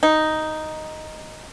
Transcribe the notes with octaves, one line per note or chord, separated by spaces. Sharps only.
D#4